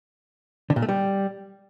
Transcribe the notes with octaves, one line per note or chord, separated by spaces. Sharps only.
D3
A#2
A3
G3